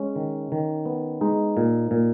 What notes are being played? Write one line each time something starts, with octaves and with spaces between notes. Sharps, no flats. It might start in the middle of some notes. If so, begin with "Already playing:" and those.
Already playing: G#3 C#4
D#3
D#3
B3
G#3 D#4
A#2
A#2